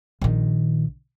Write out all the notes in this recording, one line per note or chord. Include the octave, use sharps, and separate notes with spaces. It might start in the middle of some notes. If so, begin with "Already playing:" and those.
A#1 D#3